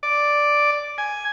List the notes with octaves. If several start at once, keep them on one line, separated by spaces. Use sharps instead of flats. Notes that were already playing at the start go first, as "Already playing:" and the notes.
D5
G#5